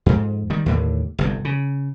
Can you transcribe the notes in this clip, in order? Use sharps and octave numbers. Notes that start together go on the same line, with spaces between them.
F2 G#2
D#3 G3
D#2 A2 D3
G1 C2 G2
C#3